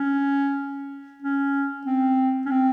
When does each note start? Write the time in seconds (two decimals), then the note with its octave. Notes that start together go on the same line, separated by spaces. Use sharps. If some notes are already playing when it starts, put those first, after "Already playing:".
Already playing: C#4
1.22 C#4
1.86 C4
2.46 C#4
2.51 C4